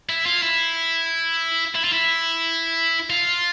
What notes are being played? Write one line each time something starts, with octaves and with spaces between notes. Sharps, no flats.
E4
F4
E4
E4
F4
E4
F4